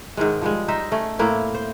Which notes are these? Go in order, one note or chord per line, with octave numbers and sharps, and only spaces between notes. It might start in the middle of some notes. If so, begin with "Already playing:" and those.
G#2 D#3 G#3
F3 G3 G#3
D#4 C5 E5
A3 C#4
A2 A#3 C4 E4
C5